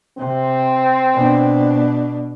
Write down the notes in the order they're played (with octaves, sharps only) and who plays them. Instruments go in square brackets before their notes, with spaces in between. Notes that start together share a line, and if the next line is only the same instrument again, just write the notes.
[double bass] C3 [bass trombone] C4
[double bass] B2 D4